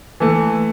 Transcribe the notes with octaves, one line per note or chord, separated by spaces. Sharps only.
E3 A3